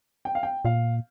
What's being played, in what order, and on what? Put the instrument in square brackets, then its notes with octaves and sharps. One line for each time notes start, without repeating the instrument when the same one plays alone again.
[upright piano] G5
F5
G5
[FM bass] A#2 [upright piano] F5